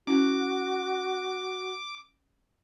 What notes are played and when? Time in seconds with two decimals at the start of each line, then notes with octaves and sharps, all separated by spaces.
0.07 C#4 E4 F#4 D6